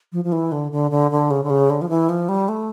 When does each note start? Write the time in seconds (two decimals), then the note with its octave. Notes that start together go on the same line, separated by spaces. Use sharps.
0.12 F3
0.24 F3
0.32 E3
0.52 D3
0.72 D3
0.91 D3
1.11 D3
1.31 C#3
1.44 D3
1.50 C#3
1.70 D3
1.82 F3
1.89 E3
2.09 F3
2.29 G3
2.49 A3